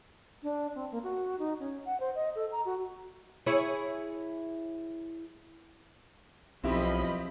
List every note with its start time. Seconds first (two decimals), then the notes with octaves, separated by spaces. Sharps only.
0.43 D4
0.75 C4
0.92 A#3
1.03 F#4
1.39 D#4
1.60 C#4
1.85 F#5
2.00 C5
2.15 D#5
2.35 A4
2.52 A#5
2.65 F#4
3.46 E4 G#4 C#5
6.64 B1 F3 C4 E4 G4 D#5 B5